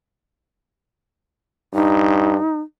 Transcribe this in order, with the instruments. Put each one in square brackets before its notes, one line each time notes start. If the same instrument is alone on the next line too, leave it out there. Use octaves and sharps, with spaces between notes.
[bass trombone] G2 [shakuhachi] D#4